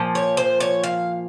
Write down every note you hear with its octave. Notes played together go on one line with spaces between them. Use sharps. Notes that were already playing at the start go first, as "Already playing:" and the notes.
Already playing: A#2 F3
C#5
C5
C#5
F5